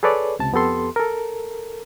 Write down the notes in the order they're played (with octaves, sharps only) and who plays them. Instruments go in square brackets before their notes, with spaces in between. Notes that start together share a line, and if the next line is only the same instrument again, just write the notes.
[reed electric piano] G#4 A4 B4 C#5 D5
C#2 C3 A5
F2 B3 G4 A4 C6
A4 A#4